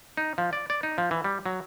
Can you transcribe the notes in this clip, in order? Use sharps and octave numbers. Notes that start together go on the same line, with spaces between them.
D#4
F3
D5
D5
D#4
F3
E3
G3
F#3